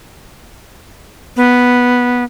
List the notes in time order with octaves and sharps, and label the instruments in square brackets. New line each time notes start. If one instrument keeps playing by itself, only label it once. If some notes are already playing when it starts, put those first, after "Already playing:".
[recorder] B3